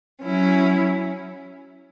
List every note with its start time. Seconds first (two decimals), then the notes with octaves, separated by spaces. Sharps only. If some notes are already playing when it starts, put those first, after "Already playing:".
0.22 F#3 C#4 E4